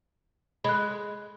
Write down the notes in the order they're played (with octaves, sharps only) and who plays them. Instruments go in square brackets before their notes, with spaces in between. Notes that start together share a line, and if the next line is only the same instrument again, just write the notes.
[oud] G#3 [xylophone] B5 F#6